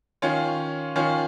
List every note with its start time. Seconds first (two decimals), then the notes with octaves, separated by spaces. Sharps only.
0.22 D#3 C#4 F4 C#5
0.96 D#3 C#4 F4 C#5